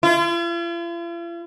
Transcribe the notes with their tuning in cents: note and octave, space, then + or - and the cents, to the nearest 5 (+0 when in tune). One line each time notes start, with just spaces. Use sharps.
F4 -45